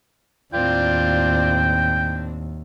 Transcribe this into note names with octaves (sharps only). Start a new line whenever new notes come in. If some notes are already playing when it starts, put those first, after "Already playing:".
D#2 A2 C4 D4 F4 D5 G5